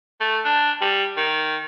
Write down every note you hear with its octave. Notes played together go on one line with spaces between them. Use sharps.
A3
D4
G3
D#3